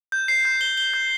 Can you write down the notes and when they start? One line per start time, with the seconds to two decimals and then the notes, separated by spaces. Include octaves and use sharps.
0.12 G6
0.28 C7
0.45 G6
0.61 G7
0.78 G7
0.94 G6